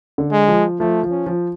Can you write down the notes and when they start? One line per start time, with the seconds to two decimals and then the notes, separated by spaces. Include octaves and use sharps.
0.18 D3
0.32 G#3
0.48 F3
0.80 F3 A3
1.03 F3
1.11 C#4
1.26 F3